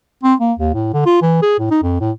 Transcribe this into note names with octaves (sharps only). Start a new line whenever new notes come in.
C4
A#3
D#2
A2
D3
F4
E3
G#4
A2
D#4
F2
A2